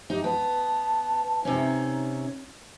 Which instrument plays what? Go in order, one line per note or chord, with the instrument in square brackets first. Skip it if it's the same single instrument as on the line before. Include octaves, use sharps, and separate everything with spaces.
[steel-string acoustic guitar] D#4 [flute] G4
[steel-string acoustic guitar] B3 [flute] A5
[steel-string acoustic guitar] C3 C#4 [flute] D#4